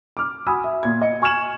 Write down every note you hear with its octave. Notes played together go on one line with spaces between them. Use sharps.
D6 F6
F#4 G#5 B5 D#6 E6
E5
A#2 G#6
D#5 C#7
G#5 C#6 F6 G#6 E7 F#7